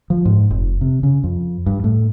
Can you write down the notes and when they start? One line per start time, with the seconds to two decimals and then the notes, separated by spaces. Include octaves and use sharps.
0.10 F3
0.25 G#2
0.50 F1
0.81 C3
1.03 C#3
1.24 F2
1.66 G2
1.84 A2